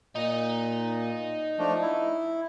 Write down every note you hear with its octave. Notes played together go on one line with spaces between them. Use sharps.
A#2 D#4
F3 A3 D4
E4